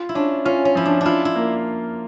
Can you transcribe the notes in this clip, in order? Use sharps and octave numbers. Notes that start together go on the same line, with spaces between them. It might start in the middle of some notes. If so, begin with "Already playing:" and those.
Already playing: F4
E4
C#4 D4
C#4 F4
C#4
F3 E4
D4
D4 E4 F4
E4
A#3